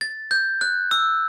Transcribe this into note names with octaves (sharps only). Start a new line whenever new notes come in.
A6
G6
F#6
E6